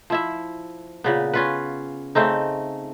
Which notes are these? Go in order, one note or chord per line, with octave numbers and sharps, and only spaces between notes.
F3 E4 E5
A#2 C#3 B3
C#4 F4 B4
C#3 A3 C4 D#4